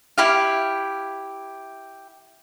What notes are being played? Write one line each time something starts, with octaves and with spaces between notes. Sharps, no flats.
E4 G4 F5